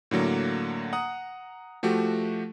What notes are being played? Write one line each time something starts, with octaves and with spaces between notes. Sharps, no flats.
A2 D3 F#3 A#3
F#5 A#5 D#6
F3 A3 F#4 G4